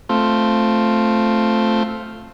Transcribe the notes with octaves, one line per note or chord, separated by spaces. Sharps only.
A3 C4 F4